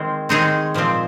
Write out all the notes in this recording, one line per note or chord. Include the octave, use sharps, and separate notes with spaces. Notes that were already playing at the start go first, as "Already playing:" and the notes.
Already playing: D#3 G#3 C4
D#3 G#3 C4 D#4 G#4
A#2 F3 G#3 C4